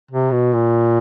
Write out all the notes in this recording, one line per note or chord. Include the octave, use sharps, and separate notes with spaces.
C3
B2
A#2